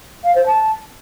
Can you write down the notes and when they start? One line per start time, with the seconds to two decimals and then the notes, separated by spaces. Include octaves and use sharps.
0.24 F5
0.35 C5
0.47 A5